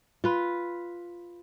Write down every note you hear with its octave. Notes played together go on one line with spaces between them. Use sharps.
F4 B4